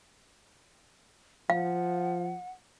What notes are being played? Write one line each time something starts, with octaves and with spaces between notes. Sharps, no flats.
F3 F5 F#5